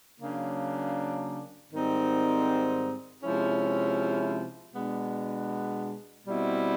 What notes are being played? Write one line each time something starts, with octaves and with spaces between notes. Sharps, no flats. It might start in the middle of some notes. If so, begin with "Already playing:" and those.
C#3 F#3 A#3 D4
G#2 D#3 G3 C4 D#4
C3 F3 G#3 C#4 E4
B2 G#3 B3 D4
B2 G3 C4 E4